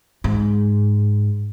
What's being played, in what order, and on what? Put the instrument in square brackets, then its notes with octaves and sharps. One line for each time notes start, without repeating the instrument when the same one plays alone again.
[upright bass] G#2